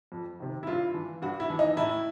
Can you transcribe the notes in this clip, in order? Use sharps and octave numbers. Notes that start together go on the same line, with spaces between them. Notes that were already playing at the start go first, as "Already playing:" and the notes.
F2
C3 D#3
E4
G2 F4
E3
G2 F#4
E4
E3
D#4
A2 E4